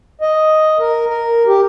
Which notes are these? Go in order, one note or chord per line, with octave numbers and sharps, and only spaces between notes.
D#5
A#4
A#4
G4